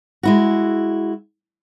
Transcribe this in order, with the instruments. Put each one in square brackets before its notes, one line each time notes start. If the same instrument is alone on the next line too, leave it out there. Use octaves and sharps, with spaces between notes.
[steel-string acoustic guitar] G#3 E4 F#4